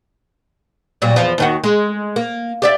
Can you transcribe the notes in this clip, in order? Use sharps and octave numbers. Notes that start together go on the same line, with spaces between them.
A#2 F#3 G3
E2 F3
D#2 D#3 F#4
G#3
A#3
G4 D5 E5